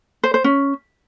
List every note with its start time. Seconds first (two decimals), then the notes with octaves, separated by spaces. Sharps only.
0.24 C5
0.34 C5
0.44 C#4